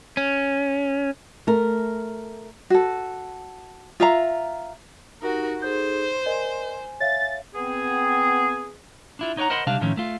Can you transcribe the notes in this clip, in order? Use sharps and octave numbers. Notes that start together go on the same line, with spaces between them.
C#4
A3 A#4
F#4 A4
F4 E5 F5 A#5
D#4 F#4 G4 A#4
D#4 G#4 A4 C5 G6
A#4 D5 D#5 G#5
C#5 E5 F5 A6
B3 C4 G#4
D4 E4 F4
D#4 C#5 D5 F#5 A#5
A#4 C5 D#5 F#5 B5 C6
C#2 C3 G3 D4 F5 A5
A2 D#3 F3 A3 C#4
A3 F4